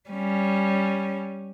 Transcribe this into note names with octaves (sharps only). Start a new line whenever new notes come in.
G3 C#4